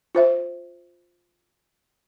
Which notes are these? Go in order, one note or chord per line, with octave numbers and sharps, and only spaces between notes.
F4 C5 E5